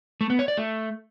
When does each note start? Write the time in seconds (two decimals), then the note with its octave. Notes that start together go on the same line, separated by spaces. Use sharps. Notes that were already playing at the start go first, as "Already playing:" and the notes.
0.21 A3
0.30 B3
0.39 C#5
0.48 D5
0.57 A3